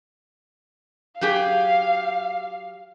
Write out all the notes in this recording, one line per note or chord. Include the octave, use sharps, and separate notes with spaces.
F#3 G4 G#4 F5